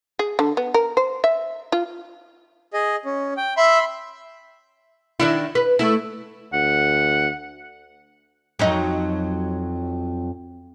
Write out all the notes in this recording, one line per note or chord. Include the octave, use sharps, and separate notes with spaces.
G#4
D3
B3
A#4
C5
E5
F4
G#4 D#5
C#4
G5
E5 B5 C6
D#3 D4 E4
B4
A3 E4
D2 F#5
F2 F#3 D#4